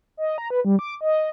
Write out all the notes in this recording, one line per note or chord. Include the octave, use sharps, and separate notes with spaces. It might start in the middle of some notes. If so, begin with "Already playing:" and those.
D#5
A#5
B4
G3
D6
D#5